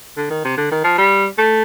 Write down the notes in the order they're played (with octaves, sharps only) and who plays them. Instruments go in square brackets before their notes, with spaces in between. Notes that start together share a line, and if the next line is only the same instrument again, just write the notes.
[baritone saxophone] D3
D#3
C3
D3
D#3
F3
G3
A3